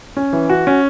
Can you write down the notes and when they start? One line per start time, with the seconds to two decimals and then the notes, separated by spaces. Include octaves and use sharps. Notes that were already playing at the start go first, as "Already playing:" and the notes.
0.17 C#4
0.33 E3
0.50 F#4
0.67 C#4